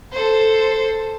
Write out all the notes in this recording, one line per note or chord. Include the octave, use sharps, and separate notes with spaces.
A4 C5